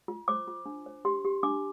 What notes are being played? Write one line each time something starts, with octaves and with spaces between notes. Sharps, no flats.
F4
C5 D6
F4
D4
C5
G4 C6
G4
D4 D6